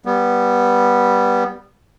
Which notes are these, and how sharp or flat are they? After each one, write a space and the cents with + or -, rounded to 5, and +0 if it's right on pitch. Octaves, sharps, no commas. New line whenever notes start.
G3 +0 B3 -15